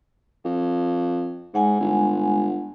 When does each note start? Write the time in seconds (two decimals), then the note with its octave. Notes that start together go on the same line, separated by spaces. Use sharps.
0.45 F2
1.54 G#2 G#3 F#5 G#5
1.81 G1